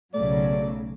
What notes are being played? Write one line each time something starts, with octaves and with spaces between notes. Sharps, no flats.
B1 C#3 F#3 A3 D5